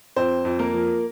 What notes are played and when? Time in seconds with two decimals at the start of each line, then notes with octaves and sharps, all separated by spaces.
0.16 F2 C4 C5
0.45 F2
0.59 A#3 A#4
0.74 F3